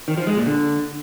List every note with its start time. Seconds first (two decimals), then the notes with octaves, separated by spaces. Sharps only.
0.08 D#3
0.17 F3
0.27 G#3
0.37 A#2
0.46 D3